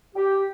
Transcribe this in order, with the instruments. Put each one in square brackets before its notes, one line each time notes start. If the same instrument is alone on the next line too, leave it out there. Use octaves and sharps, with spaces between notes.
[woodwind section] G4